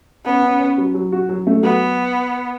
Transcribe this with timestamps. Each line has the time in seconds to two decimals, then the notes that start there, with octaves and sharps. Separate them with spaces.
0.25 B3 C#4
0.42 C#4
0.59 C#4
0.78 F#3
0.94 F#3
1.12 F#4
1.29 F#3
1.47 A3
1.63 F#3 B3